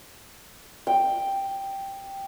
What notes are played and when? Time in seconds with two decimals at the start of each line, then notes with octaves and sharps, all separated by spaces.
0.87 G5